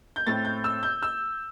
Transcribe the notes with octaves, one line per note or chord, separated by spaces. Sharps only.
G6
A2 A3 C4 A6
G6
E6
G6
E6